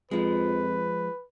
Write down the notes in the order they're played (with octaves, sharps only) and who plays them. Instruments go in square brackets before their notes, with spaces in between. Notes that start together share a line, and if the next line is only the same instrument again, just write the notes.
[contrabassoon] F2 [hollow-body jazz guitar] F3 G#3 [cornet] B4